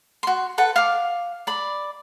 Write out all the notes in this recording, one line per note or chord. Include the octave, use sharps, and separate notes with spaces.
F#4 C6
A4 B4 F#5
F5 D6
D5 B5